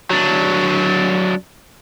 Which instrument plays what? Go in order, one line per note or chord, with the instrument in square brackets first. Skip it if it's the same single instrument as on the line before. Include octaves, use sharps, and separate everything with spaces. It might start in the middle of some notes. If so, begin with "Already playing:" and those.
[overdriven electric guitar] F#3 D4